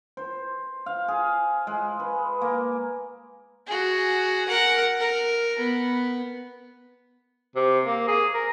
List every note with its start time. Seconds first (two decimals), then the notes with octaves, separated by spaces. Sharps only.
0.17 C5
0.86 F5
1.08 G#4
1.67 G#3
2.00 B4
2.41 A#3
3.67 F#4 G#4
4.48 A#4 F#5
5.00 A#4
5.59 B3
7.56 C3
7.83 A#3
8.08 G#4
8.34 A#4